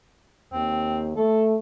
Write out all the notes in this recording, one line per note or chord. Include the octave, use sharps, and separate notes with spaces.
D#2 C4
A3 A4